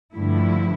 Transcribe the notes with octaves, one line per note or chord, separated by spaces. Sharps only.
G2 D3 F3 A3 E4